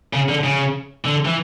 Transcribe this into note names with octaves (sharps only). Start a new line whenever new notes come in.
C#3
D3
C#3
D3
E3